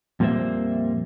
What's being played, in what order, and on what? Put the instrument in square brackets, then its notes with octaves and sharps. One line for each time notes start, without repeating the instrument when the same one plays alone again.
[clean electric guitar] F2 A#2 G3 A#3 C5 E5